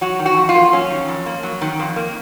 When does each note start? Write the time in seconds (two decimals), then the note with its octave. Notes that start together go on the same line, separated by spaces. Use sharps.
0.01 F#3 F#4
0.19 D#3
0.26 F#4
0.37 F2
0.49 F4
0.55 A#3
0.72 F#3 C#4
0.90 D#3
1.08 F2
1.26 A#3
1.43 F#3
1.61 D#3
1.79 F2
1.96 A#3